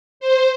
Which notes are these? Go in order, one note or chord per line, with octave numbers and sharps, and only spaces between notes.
C5